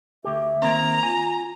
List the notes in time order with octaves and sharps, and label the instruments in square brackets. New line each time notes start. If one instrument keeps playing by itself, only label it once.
[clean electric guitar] D2 G4 [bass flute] E5
[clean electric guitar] D#3 A#3 C4 [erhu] A#5
[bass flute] F4 [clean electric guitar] G#5